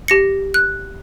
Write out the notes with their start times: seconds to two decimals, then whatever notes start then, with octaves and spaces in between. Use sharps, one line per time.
0.08 G4 A#6 C#7
0.54 F#6